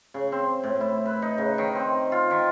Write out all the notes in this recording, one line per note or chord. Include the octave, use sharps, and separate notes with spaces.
C#3
C4
A2
E4
B4
D#4
C#3
D#3
C4
F4
D#3